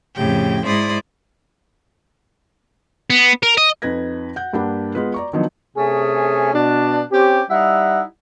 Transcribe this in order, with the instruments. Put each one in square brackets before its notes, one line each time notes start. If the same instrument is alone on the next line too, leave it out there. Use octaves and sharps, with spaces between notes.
[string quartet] F2 A2 C#3 G4 G5
G#2 G#3 E4 C5 D5 D#6
[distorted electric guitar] B3
A#4
D#5
[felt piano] F2 D#4 B4 G#6 A#6
F#5 G6
G2 A#3 D4 G4 F#5 B5
G#3 B3 F4 B4
D5 A#5 C#6
D#3 F3 F#3 B3 D4 D#4
[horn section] C3 A3 C#4 G#4
B2 D4
C4 C#4 G4
G3 D#4 E4 E5 F#5